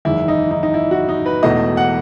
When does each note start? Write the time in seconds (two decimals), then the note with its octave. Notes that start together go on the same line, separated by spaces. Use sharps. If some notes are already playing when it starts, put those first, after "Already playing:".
0.05 F#1 E2 D#3 G#3 E4
0.28 D#4
0.51 D#4
0.63 D#4
0.74 E4
0.91 F#4
1.09 D#4
1.26 B4
1.43 E1 E2 B2 A3 D#5
1.77 F#5